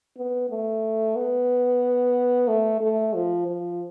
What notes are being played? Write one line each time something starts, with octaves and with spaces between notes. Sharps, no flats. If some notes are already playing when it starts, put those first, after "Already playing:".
B3
A3
B3
A3
A3
F3
F3